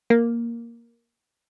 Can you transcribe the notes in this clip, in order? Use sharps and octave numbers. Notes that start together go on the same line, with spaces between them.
A#3